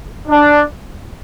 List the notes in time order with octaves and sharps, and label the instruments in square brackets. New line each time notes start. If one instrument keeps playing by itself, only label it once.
[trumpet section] D4